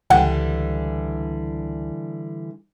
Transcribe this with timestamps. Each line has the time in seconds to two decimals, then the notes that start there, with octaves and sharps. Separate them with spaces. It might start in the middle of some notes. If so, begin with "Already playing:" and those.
0.10 C#2 D3 E3 G3 F#5 G5